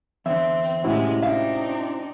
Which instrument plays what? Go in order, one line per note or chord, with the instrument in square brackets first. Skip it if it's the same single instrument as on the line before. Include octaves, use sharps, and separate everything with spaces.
[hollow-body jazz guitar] E2 D3 [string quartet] C4 [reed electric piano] E5
[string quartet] A2 C3 G#3 [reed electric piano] C#4 E4 F#4
[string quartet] C4 D4 D#4 [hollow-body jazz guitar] E5 F5